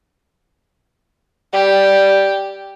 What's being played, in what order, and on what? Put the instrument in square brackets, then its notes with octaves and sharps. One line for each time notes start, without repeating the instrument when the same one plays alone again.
[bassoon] G3 [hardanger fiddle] G4